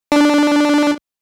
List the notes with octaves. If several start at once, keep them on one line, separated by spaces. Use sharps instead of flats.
D4